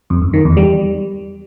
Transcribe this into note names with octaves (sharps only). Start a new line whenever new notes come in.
F2
F#2
D#3
E2
G3